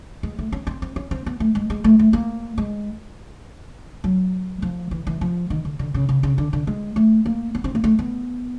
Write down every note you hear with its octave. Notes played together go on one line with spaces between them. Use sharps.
G#3
A3
C#4
C4
C4
C#4
C4
B3
A3
G#3
G#3
A3
A3
A#3
G#3
F#3
F3
E3
E3
F3
D#3
D3
D3
C#3
C#3
C#3
D3
D3
G#3
A3
A#3
B3
C4
A#3
A3
B3